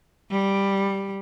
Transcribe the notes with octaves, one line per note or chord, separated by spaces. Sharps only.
G3